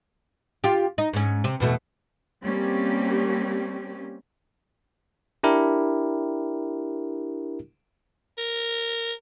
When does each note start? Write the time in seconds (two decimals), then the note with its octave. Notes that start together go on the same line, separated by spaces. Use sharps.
0.64 F4 G4
0.98 D#4
1.13 G#2 C#4
1.44 C3
1.60 E2 B2 A3
2.43 G3 A#3 C4 C#4 G4
5.43 D4 E4 G4 A#4
8.38 A#4